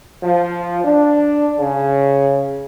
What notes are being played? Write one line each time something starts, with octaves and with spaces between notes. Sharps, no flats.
F3
D4
C#3